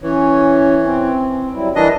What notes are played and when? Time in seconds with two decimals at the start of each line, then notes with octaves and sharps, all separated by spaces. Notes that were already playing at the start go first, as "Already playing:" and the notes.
0.02 E3 C#4 C#5
0.83 C4
1.52 F#3 G3 E4
1.75 E3 D4 A#4 D#5